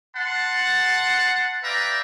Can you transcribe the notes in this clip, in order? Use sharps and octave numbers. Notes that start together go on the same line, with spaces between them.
F#5 A5 C6
B4 D5 E5 F5 G5 A#5